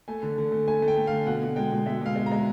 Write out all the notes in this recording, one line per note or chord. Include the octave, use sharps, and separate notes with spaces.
A3 G#5
D3
D3
A3
A3 G#5
A3
G5
A3
F5
D3
B2 F#5
B2
G#3 G5
B2
G#3 E5
B2 F5
G#3
A#5
G#3